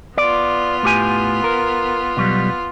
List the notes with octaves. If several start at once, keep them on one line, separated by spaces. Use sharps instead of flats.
B3 F4 D5
A2 G4 G#5
A#4
B2 F#3 G3